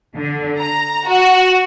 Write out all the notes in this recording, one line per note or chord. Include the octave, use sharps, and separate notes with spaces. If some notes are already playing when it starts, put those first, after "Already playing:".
D3
A#5
F#4